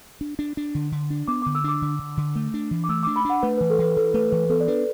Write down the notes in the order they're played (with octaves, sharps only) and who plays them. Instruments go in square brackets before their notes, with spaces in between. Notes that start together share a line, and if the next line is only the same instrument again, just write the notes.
[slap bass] D4
D4
D4
D3
D3
D4
[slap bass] B3 [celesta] D6
[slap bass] D3 [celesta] D6
[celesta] E6
[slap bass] D4 [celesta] D6
[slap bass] D3
D3
D3
A3
D4
E3
[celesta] D6
[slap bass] A3 [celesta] E6
[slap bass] D4 [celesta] D6
[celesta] B5
[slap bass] D4 [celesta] F#5
[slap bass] A3 [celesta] B4
[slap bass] E3 [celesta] B4
[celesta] A4
[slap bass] E3 [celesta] B4
[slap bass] E3 [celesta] A4
[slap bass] A3 [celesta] B4
[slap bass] E3 [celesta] B4
[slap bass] B3 [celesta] A4
[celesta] D5
[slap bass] D4 [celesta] B4